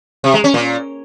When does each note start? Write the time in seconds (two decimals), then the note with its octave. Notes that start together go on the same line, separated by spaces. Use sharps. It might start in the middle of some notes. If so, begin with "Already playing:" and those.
0.24 C3
0.34 G#3
0.44 C#4
0.54 A#2